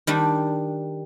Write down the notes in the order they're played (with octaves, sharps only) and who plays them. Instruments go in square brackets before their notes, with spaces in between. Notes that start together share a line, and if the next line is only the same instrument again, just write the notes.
[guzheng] D#3 G3 D4